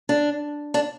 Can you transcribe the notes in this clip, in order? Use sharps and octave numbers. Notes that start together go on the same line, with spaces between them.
D4
D4